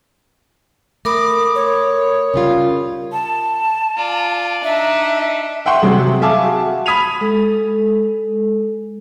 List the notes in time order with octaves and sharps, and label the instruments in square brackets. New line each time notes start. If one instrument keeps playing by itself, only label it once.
[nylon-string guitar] A3 [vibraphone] A#4 B5 D#6 [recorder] D6
[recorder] C#5
[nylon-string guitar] C#3 G3 F4
[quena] A5
[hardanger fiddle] F4 D5
[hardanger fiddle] D4 D#4 [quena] E5
[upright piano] E5 F#5 G5 C6 C#6
C3 F#3 G#4
G#4 E5 F5 G#5 A5 D6
F#4
B5 D#6 G#6 B6 D#7 F7
[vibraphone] G#3 A4